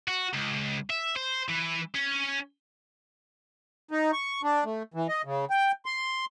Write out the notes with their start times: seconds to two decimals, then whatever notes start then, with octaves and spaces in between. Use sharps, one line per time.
0.08 F#4
0.34 C#2
0.90 E5
1.16 C5
1.49 E3
1.95 C#4
3.91 D#4
4.13 C#6
4.43 D4
4.65 A3
4.94 E3
5.09 D#5
5.25 C#3
5.50 G5
5.86 C6